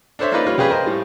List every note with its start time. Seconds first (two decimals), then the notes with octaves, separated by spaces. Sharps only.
0.19 D4 A4 C5 C#5 E5
0.32 A#3 C#4 D#4 F4 B4 D5
0.47 G3 C#4 F4 B4 C#5
0.58 C#3 G4 G#4 B4
0.70 A#4 C5 D#5
0.86 A2 G3